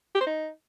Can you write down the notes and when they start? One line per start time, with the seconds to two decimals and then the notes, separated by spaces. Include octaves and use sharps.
0.15 G4
0.21 C5
0.27 D#4